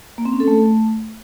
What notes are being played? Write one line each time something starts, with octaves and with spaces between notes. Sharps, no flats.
A#3
C4
C#4
A4
A3